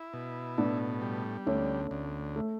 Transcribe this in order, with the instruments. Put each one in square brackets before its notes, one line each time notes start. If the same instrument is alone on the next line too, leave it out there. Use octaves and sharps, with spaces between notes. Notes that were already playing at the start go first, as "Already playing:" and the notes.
Already playing: [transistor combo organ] E4
B2
[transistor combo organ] A2 [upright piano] B3 D4
[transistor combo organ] G3
[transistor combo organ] D2 [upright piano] A3 C#4
[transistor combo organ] D2
[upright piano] A3